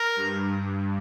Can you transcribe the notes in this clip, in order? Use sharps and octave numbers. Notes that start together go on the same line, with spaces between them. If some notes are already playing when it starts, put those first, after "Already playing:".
Already playing: A#4
G2